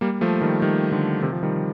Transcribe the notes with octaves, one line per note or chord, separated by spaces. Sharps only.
G3 A#3
F3 A3
D#3 G3
D#3 G3
D3 F3
C3 D#3
F3
D#3 G3